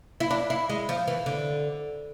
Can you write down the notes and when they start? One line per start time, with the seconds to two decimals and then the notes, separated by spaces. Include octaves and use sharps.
0.20 E4
0.31 D4
0.50 E4
0.69 G#3
0.89 F3
1.08 E3
1.26 D3